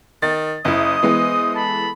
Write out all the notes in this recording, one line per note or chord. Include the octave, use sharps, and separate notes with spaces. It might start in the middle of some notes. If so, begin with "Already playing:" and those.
D#3 A6
F#1 E4 C5 D#5 D#6
E3 G#3 B3
A4 A5 B5